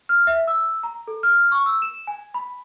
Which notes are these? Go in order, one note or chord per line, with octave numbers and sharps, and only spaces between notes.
F6
E5
E6
A#5
A4
F6
C#6
E6
E7
G#5
B5